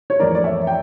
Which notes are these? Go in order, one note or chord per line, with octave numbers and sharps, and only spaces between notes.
C#5
F2 E3 A3 A#4 D5
D5
C#5 E5
G5